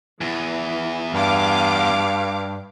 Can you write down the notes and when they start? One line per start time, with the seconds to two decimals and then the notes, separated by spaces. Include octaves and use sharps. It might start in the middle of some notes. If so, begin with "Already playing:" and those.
0.21 E2 E3
1.14 G2 F5 D6